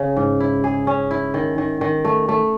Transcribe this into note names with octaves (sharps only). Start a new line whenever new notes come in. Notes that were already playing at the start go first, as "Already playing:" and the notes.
Already playing: C#3
G#2
E4
G#4
C#4
E4
D#3
D#3
D#3
A3
A3